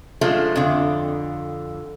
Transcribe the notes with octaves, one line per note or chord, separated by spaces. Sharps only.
F3 G#3 A3 D4
F2 D3